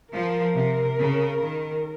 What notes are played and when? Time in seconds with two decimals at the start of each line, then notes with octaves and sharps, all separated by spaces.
0.13 F3 A#4
0.55 C3
0.98 C#3
1.42 D#3